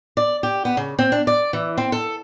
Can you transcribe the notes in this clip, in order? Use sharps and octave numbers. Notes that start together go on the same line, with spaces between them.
D5
G4
B3
C#3
C4
D4
D5
E3
C4
A4